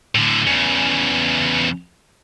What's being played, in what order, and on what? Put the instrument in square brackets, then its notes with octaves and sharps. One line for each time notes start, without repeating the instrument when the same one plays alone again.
[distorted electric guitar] A2 D3
E2 C#3